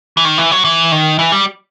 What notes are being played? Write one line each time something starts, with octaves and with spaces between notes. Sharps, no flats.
E3
D#3
E3
F#3
E3
D#3
E3
G3